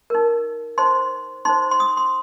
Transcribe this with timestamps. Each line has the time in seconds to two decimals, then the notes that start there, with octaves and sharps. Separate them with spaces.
0.10 D#4 A#4
0.78 D#4 C5 C6
1.45 D#4 C5 C6
1.71 C6
1.80 D#6
1.97 C6